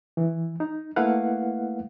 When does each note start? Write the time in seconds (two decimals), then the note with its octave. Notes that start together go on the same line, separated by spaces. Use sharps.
0.17 E3
0.60 D#4
0.96 A3 A#3 E4 B4 F5 F#5